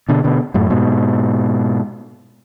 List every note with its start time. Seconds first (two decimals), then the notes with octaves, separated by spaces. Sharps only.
0.09 B2 D3
0.24 B2 D3
0.54 F#2 A2
0.70 G#2 B2